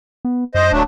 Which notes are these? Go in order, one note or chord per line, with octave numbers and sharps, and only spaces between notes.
B3
F#2 C5 D#5
D1 F#3 A3 D4